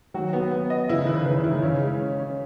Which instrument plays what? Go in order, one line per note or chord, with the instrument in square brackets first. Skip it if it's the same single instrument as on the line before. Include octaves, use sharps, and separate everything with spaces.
[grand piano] D#3 F#3 [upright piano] F#4
[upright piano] B3
B3
D#5
[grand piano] C#3 E3 [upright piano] E4
[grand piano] D#3
[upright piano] B4
[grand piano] C#3
[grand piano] D#3 [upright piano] B4
[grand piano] C#3 E3
[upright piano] E4
[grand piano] D#3
[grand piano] C#3 [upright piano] C#4
[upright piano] G#3
C#4
C#4